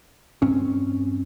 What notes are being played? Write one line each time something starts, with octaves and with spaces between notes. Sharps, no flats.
G2 C4 C#4